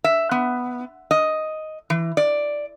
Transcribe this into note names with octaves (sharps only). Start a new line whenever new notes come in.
E5
B3
D#5
E3
D5